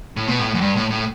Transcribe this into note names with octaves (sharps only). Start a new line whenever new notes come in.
A2
B2
A2
F#2
G2
A2
A2